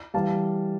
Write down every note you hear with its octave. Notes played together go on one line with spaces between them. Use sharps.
E3 G3 F5 A5